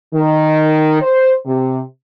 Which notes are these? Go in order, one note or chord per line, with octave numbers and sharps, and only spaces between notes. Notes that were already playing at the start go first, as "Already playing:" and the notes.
D#3
C5
C3